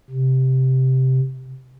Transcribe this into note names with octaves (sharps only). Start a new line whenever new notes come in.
C3